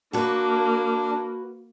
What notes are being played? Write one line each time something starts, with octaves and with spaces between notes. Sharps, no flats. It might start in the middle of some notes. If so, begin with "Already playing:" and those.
A#3 D4 F#4 B4